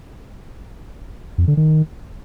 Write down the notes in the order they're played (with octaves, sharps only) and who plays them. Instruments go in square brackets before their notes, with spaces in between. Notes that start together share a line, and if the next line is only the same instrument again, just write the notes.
[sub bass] F2
D3
D#3